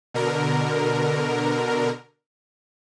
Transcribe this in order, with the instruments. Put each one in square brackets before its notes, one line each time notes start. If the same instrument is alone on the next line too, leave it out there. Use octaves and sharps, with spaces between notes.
[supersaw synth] B2 D3 A#4